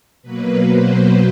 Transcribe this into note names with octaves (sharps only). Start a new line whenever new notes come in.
B2 F#3 A#3 B4
C5